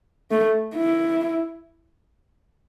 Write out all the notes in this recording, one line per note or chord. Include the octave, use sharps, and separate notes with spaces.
A3
E4